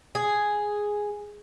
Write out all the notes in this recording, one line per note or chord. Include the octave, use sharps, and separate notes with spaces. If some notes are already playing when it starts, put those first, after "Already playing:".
G#4